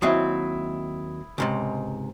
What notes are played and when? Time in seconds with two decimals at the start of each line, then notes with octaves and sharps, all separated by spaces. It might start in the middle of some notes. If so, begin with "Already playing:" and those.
0.02 D#2 F#3 C4 E4 E5 D#6
1.38 C#2 G#2 C3